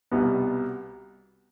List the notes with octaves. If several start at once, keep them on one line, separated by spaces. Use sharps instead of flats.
C2 B2 G3 B3